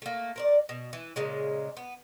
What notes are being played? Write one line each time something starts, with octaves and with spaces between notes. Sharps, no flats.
A3 A#3
A#4 C5 D5
B2
E3
A#2 C#3 G#3
B3